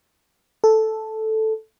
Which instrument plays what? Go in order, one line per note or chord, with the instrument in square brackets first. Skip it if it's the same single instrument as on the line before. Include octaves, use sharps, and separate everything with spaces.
[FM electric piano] A4